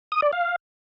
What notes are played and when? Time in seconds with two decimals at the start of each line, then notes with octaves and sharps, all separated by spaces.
0.12 D#6
0.22 D5
0.33 F5